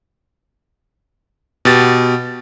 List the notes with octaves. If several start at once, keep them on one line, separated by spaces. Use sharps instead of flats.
B2 G4 A6